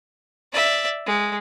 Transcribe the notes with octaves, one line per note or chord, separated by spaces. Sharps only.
D5 E5
G#3